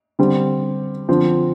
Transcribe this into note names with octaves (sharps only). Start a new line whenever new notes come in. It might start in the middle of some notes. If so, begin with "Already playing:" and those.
D3 G3 C4
D3 F3 C4